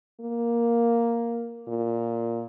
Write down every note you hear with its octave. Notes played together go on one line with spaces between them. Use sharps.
A#3
A#2